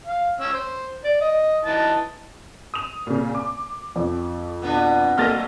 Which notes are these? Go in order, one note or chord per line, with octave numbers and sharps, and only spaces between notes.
F5
C#4 E6
C5
D5
D#5
E3 D#4 A5
D#6 F7
A#2 C#3
D6
F2
B2 B3 D4
F#3 A3 A#3 A#4 D#5 F6 A6 A#6